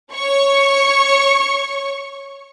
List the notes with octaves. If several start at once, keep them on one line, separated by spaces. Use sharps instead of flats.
C#5 C#6